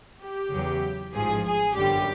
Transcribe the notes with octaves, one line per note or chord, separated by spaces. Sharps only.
G4
E2 C#3 F#3
A1 G#2 F3 G#4
G#4
G1 F#2 D3 G3 G4